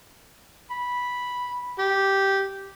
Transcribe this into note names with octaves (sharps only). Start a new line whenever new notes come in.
B5
G4